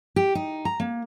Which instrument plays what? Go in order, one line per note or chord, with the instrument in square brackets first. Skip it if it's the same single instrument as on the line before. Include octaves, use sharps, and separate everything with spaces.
[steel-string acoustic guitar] G4
D#4
A#5
A#3